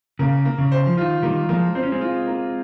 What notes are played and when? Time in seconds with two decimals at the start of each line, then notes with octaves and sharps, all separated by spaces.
0.19 C#3 A#3
0.45 A#3
0.58 C#3
0.72 C5
0.86 F3
0.97 D#3 F4
1.22 D#3 G3 A#3
1.49 F3 G#3 A#3
1.75 C4 C5
1.83 C#4
1.92 G#3 C4
2.01 F4
2.27 A#3